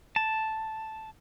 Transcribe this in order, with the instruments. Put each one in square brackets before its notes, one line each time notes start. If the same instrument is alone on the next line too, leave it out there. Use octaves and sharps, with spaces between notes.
[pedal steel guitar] A5